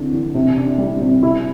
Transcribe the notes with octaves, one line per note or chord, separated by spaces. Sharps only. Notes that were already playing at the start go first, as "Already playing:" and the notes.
Already playing: E2 D3 C4
E2
C3
D4
G3
C3
E4